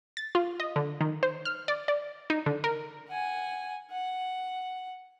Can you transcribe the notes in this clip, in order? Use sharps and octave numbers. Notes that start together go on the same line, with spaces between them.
A6
F4
D#5
D3
D#3
C5
F6
D5
D5
D#4
D3
A#4
F#5 G#5
F#5